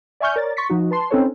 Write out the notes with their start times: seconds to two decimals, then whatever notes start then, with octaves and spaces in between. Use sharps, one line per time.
0.20 D5 E5 G#5 C#6 F6 G6
0.36 A#4 C#5 D5 A6
0.57 C6 C#6 A6 B6 C#7
0.70 F3 D#4 F#4
0.91 B4 A5 C6
1.10 C4 C#4 D#4 A4 B4 C#5